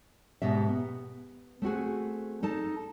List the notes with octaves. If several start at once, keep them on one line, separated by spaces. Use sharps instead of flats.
G#2 B2 G4 E5
B3
A3 C4 F#4 G#4
D#4 A4 A5